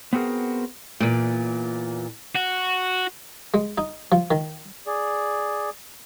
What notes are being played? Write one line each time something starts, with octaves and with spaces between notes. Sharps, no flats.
B3 C4 F#4 G#4 A#4
E2 A#2
F#4
G#3
D#4
F3
D#3
G#4 D5